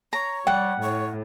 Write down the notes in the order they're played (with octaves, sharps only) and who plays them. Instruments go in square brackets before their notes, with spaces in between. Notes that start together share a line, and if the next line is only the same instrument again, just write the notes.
[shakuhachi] C#5 [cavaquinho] A#5
[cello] G3 [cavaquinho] F#5 [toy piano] G5
[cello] A2 [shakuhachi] C#5